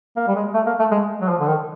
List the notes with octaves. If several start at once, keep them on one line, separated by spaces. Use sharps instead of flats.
A#3
G3
G#3
A3
A#3
A3
G#3
F#3
F3
D3
D#3